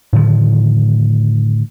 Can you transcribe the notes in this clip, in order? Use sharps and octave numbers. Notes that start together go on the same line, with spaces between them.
A2 D3 D#3 F3